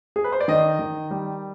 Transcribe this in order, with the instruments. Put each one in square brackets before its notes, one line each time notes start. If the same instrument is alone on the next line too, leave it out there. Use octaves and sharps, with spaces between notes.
[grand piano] G#4
B4
C5
D5
D#3 D#5
D#3
G3